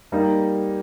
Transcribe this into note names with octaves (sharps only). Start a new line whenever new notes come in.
G3 A#3 D#4